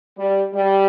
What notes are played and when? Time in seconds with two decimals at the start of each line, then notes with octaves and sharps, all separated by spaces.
0.18 G3
0.53 G3